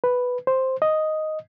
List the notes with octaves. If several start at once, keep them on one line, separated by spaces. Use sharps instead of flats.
B4
C5
D#5